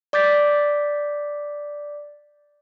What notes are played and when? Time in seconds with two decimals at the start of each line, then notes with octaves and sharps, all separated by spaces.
0.13 D5 D6 G6 A6 B6